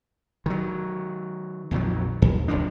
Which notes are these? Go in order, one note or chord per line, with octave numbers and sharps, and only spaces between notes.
D#3 F#3
A#1 F2 D#3 F#3
D#2
D1 G1 F3 D4